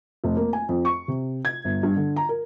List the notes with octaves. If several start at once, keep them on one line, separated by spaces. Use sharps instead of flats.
F1
A#3
G#5
F2
C#6
C3
G#6
G1
G2
D3
A#5
A#4